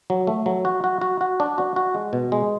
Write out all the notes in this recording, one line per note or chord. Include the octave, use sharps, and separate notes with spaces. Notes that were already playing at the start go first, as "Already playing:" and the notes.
F#3
A3
F#3
F#4
F#4
F#4
F#4
D4
F#4
F#4
G#3
B2
G#3